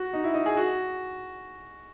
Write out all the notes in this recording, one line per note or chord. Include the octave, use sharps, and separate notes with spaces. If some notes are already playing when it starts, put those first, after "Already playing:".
Already playing: F#4
D#4
E4
D#4
G#4
F#4